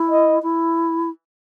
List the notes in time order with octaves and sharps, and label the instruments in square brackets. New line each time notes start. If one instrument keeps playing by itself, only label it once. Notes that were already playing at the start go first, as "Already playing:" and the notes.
Already playing: [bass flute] E4
[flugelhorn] D#5
[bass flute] E4